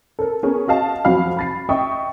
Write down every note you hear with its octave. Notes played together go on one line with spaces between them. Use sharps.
A4 A#4
B3 C#4 G#4 A#4
F#4 D#5 F5 A5
F2 F#3 F#4 F5 B5
B5 A6 C7
D#5 E5 G5 C#6 D#6